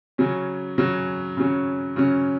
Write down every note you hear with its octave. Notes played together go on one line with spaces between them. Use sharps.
C#3 F#3 C#4
C#3 F#3 C#4
C#3 F#3 C#4
C#3 F#3 C#4